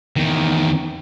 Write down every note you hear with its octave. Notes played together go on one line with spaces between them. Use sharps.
E2 D#3